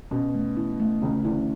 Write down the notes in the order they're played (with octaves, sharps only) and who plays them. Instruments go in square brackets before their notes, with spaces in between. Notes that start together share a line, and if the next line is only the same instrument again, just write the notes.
[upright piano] B2 [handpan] C#4
[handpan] A3
E4
A3
[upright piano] C#2 C#3 [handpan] C#4
[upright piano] D2 D3 [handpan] E4